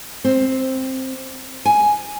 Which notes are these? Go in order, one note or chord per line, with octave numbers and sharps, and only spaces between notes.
C4
G#5